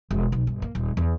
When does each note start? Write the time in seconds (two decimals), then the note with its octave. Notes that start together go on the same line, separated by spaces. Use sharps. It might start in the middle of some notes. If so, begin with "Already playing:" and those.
0.11 E1
0.32 B1
0.47 G1
0.62 A#3
0.75 D#1
0.97 E2